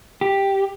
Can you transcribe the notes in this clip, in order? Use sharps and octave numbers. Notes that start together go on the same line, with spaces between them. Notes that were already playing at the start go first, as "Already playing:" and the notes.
G4